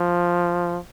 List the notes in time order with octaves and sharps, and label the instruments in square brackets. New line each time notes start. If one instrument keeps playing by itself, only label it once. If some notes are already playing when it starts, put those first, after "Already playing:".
Already playing: [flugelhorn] F3